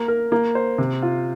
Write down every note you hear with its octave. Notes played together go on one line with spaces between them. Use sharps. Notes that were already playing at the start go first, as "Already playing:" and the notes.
Already playing: A#3
A#4
A#3
C5
C3
F4